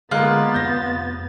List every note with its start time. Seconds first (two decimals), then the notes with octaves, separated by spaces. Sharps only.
0.11 D3 G#3 A#3 B3 F4 F#6 A6
0.54 F2 A3 G6 A#6